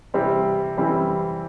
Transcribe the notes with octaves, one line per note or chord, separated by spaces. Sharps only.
C3 E3 G3 C4
C3 E3 G3 C4